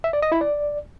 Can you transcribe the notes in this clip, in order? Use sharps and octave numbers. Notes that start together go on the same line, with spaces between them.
E5
D5
D#5
E4
D5